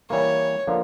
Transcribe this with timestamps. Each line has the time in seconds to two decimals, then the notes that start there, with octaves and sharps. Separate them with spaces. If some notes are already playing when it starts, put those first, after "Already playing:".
0.10 E3 G3 A#3 C#5
0.67 D3 F3 A#3